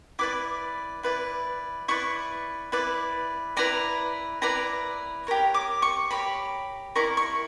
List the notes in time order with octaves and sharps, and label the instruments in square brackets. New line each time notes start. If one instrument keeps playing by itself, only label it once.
[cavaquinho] E4 B4 D5 D6
E4 B4 D5
E4 B4 D5 C#6
E4 B4 D5
E4 B4 D5 A#5
E4 B4 D5 A#5
G4 A#4 C#5
D6
C#6
G4 A#4 C#5 B5
E4 A#4 D5 C#6
C#6